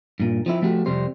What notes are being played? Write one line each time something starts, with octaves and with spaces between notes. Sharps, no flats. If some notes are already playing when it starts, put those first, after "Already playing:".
G2 A#2
F3 C4 E4
F3 A3 C4 F#4 G4
F2 C3 G3 C5